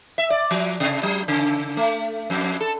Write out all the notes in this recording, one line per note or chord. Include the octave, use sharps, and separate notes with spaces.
E5
D5
F3
C3
F#3
C#3
A3
F2
A4